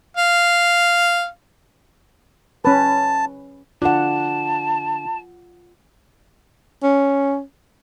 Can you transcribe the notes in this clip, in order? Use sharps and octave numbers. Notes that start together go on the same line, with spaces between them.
F5
C#4 B4 A5
D3 D4 F4 F#5 A5
C#4